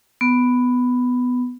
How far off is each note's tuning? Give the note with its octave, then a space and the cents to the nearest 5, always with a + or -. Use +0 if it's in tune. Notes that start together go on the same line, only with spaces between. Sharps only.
B3 +10